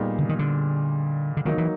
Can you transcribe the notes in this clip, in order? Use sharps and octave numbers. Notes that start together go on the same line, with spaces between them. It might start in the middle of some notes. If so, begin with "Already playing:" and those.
Already playing: A#2 G3 B3 D#4 G#4
D3
D#3
D3
D3
D#3 F#3 A#3 D#4
E3